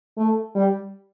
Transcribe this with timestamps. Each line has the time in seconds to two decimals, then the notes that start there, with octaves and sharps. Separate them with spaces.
0.17 A3
0.55 G3